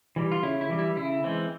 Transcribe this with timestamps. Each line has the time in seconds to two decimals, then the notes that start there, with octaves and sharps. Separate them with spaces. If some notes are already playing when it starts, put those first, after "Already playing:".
0.16 E3 G3
0.32 F4
0.43 C#3 E4
0.61 E4
0.69 E3 G3
0.79 E4
0.96 C#3 E4
1.24 E3 G#3 C4